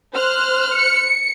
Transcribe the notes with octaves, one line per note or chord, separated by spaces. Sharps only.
C5 F6 F#6
C#7